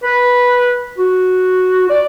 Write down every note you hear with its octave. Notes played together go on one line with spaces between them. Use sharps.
B4
F#4
D5